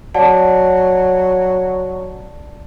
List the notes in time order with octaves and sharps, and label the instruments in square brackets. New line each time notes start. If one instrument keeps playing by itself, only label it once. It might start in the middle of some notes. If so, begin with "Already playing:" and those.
[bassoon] F#3 [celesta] D5 F#5 A5